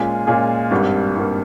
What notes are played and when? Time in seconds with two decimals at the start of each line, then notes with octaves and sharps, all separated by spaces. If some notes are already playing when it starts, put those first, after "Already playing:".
Already playing: A#2 G#3 C#4 F4 G#4
0.27 A#2 G#3 C#4 F4 G#4
0.71 G#1 G2 G3 A#3
1.15 G#1 G2 G3 A#3